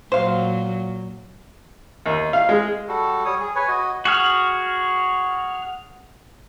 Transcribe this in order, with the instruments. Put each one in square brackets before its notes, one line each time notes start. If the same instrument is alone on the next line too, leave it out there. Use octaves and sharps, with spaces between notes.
[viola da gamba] A#2 F#3 [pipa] C5 F5
[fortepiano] D#2
F5
G#3
[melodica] G3 F#4 A4
G3 C#5 D#6
G#4
B4 C#5 G#5
F#4 D#5
[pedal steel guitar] F#4 G#4 F6